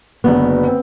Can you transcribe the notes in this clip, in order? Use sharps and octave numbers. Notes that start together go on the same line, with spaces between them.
F#1 D3 B3 F#4
C4